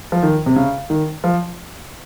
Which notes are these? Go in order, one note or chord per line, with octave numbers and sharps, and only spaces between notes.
F3
D#3
C3
C#3
D#3
F3